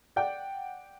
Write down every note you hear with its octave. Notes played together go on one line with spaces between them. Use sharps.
D5 F#5 G5